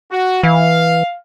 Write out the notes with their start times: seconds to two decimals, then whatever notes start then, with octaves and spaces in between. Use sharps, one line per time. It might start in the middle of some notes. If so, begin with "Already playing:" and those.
0.11 F#4
0.43 E3 F5